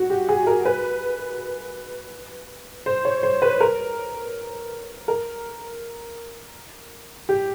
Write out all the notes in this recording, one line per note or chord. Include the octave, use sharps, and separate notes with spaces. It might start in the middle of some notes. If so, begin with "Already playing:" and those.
Already playing: F#4
G4
G#4
A#4
B4
C5
C#5
C5
B4
A#4
A#4
G4